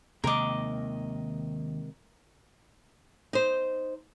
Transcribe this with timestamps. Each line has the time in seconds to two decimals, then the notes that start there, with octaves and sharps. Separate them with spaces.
0.24 D#2 C3 D#3 G#3 A#4 D#5 D6
3.33 D#4 C5